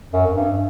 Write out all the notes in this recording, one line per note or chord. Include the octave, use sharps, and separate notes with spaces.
F#2
F#2
G2